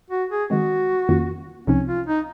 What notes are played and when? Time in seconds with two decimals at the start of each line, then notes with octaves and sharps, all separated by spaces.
0.10 F#4
0.30 G#4
0.50 D#3 G#3 C4 F#4
1.09 F2 D#3 A#3 C#4 F4
1.67 C2 C3 F3 C4 C#4 D#4
1.87 F4
2.07 D#4